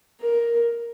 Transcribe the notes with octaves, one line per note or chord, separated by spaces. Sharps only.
A#4